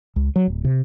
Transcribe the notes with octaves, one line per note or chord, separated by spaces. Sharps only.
C#2
F#3
D1
C3